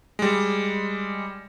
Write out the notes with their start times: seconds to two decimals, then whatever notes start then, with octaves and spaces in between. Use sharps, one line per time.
0.19 G3 G#3